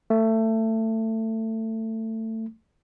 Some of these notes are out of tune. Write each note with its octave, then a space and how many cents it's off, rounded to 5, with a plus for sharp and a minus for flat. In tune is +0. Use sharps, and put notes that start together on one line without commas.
A3 +20